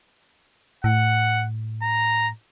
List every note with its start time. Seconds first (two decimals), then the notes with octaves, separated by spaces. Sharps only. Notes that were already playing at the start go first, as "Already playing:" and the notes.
0.84 A2 F#5
1.82 A#5